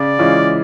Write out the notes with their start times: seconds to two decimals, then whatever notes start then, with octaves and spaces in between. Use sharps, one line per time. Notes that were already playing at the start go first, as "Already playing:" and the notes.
Already playing: C#3 D5
0.19 E3 G#3 C#4 F4